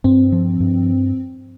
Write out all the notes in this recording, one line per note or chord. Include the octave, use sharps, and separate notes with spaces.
G2 C4
F3
G2